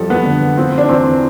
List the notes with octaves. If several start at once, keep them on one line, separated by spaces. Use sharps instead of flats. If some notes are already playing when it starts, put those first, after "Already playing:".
Already playing: F2 G3 A4
B3
D3
F3 C4
D4
E2 C4